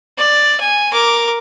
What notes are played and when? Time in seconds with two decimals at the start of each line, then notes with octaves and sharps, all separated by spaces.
0.18 D5
0.60 G#5
0.93 A#4 D6